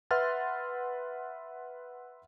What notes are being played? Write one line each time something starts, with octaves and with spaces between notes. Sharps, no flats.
B4 E5 F#5 C6 F6 A6